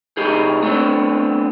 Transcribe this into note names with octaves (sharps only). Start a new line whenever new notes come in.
C2 A2 D#3 D#4 G4 G#4
A3 B3 C4 D4